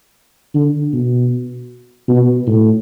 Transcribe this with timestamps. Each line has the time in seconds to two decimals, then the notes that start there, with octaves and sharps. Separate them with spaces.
0.55 D3
0.93 B2
2.08 B2
2.47 A2